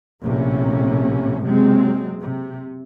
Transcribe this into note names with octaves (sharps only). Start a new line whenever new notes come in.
A#1 A2 C3 A#3 C#4
F#1 C3 F#3 G#3 C4
C3